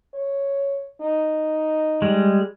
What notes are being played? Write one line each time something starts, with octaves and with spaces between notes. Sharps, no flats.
C#5
D#4
G3 G#3